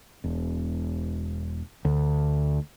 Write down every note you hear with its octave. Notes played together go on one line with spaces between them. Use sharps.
E1
D2